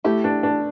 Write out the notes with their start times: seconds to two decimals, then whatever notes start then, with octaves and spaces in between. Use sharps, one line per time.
0.04 A3 E4 G4
0.24 D4
0.43 D4